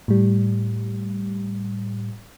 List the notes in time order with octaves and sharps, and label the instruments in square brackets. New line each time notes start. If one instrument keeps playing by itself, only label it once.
[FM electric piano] A2 G3